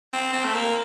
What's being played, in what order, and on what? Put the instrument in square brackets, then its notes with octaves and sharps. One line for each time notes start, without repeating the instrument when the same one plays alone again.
[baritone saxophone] C4
C4
A3
A#3